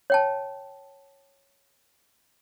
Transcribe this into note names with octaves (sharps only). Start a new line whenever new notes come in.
C#5 G5 A5